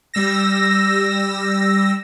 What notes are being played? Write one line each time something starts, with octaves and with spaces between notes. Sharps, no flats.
G3 E6 A#6